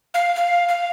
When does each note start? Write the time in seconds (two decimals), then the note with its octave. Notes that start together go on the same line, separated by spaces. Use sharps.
0.14 F5
0.36 F5
0.69 F5